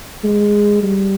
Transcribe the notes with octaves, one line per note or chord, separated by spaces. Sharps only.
G#3
G3